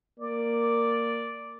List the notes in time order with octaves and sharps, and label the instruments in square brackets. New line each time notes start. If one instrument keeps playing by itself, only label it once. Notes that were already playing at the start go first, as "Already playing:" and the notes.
[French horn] A#3 [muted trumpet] D5